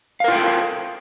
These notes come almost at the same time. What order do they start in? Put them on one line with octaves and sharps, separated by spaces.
F5 A#4 F4 G5 A4